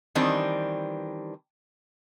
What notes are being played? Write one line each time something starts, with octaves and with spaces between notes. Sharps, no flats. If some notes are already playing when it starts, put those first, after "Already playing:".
D#3 E3 G3 C4 D4